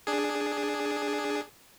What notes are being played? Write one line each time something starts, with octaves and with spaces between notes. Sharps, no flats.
D4 G#4